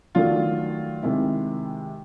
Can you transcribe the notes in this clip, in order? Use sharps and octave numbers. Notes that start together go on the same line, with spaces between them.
D#3 F#3 A3 D4 F4
C3 D#3 G#3 C4 E4